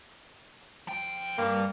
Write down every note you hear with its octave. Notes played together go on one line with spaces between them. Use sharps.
F3 G5
G2 A#3